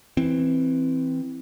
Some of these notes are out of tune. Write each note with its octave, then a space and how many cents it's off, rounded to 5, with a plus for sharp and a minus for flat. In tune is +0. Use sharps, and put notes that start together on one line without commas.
E3 +0 C4 +0